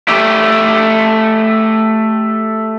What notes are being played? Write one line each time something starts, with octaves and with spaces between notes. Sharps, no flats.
A3 G4